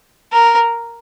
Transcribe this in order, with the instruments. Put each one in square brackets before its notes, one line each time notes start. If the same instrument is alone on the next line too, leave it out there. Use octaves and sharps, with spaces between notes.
[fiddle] A#4